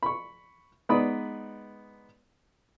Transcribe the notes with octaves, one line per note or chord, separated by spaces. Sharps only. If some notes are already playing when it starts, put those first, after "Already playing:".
B5 C#6
G#3 B3 D#4 D5 B5 D#6